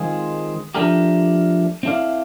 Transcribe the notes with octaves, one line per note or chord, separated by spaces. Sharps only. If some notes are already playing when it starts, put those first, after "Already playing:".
Already playing: D#3 G#3 C4 F4 G#4
F3 A3 D4 G4 A#4
C4 E4 A4 D5 F5